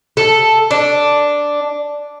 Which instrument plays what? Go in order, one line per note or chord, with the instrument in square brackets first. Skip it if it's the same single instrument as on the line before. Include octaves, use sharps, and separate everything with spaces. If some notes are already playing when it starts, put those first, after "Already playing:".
[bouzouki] A4
D4